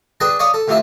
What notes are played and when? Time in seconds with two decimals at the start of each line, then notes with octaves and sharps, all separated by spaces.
0.20 D4 G#4 B4 G5 A5
0.39 C#5 D5 F5 B5 C#6 D#6
0.54 A4
0.68 A2 C3 F3 C5 E5 A5